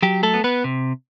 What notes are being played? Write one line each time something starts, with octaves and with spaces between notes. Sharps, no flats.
F#3 G4
A3 A4
B3
B3 B4
C3